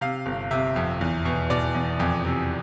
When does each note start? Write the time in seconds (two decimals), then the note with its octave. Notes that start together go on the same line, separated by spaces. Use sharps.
0.01 C3 F5
0.26 G1
0.51 C3 E5
0.76 F2
1.01 E2
1.25 B2
1.50 B2 D5
1.75 E2
2.00 F2
2.25 C3